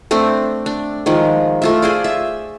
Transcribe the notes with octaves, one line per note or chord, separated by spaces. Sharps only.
A3 C4 D4
D4
D#3 F3 G#3
A3 F4 E5
G#4 C5 D5
E5